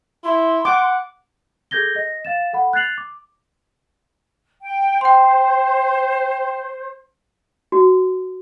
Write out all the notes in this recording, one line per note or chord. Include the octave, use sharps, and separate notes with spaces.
E4 C6
F#5 D6
G#4 A4 G6 G#6 A#6 G7
D#5 A#6
F5 A6 E7
A4 F#5 B5
F#6 G#6 A6 C7 F7 F#7
D6
G5
C5 G5 C6
F#4